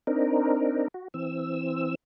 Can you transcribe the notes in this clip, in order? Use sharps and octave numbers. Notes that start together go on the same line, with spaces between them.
C4 D4 D#4 A#4
F#4
E3 C4 E6